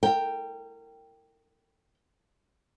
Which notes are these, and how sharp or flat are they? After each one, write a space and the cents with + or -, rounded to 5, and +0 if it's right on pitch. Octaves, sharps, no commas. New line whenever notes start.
A#4 -30 G5 +0